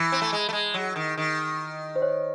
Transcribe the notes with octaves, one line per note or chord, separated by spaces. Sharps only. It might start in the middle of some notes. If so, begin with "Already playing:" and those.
Already playing: E3
C4
A3
G#3
A3
G#3
F#3
D#3
D#3
C5
C#5